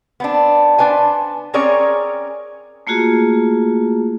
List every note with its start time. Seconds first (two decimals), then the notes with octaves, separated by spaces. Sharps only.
0.20 B3 C4 D4
0.78 B3 D4 B4 C5 G#5
1.54 C4 C#4 G#4 A#4 C#5 D5
2.87 A3 A#3 F4 F#4 G#4